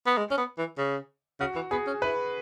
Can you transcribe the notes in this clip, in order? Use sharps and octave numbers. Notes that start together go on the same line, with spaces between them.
B3
G#3
C#4
B3
E3
C#3
C#3 F#4
E3
B3 G#4
C#4
E4 B4